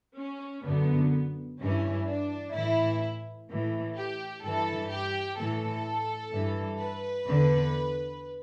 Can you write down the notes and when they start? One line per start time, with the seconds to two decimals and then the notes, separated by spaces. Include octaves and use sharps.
0.19 C#4
0.66 F#2 D3 B3
1.60 G2 E3 C#4
2.07 D4
2.54 A2 E3 E4
3.49 A2 E3
3.95 G4
4.43 G2 E3 A4
4.90 G4
5.37 A2 E3 A4
6.32 G2 E3
6.79 B4
7.26 E2 D3